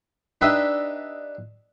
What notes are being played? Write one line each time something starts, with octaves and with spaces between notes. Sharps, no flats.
D4 D#4 G4 B4 D#5 E5